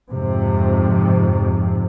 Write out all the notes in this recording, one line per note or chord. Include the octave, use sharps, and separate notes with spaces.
F2 G#2 C3